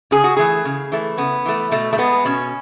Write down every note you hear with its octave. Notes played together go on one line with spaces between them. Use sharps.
C#3 G#4
F#4
E3 A3 G#4
C#3
E3 A3
C#3 B3
E3 A3
B2 A3
A3
G#3 B3
B2 C#4